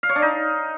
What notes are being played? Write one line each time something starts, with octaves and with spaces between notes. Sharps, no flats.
F5
C#5
D4
D#4